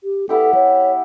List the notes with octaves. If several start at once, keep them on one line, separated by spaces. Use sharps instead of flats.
G4
B3 E4 G4 A4
C#5